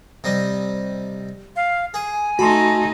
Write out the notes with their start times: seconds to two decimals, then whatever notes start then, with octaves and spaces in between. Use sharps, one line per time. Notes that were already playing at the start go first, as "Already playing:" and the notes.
0.24 C3 G3 D#5
1.56 F5
1.94 G#4 G#5
2.39 A3 D#4 F#4 A5 B5 C6